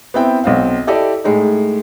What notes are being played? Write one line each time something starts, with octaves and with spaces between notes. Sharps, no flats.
B3 C4 E4 G5
B1 C4 F5
E4 G4 A4 D5 D#5
A2 G#3 D#4